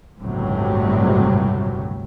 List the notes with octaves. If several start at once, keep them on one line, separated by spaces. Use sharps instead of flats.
G1 C#2 A2 C3 F#3 G3